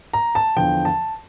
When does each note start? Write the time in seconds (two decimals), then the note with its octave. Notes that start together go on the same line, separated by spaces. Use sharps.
0.13 A#5
0.35 A5
0.56 E2 D3 F3 G5
0.85 A5